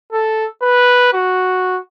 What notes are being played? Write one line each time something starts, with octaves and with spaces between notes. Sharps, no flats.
A4
B4
F#4